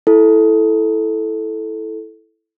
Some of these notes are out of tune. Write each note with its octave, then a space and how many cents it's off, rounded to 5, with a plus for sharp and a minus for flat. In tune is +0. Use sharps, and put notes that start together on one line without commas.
E4 +0 A4 -10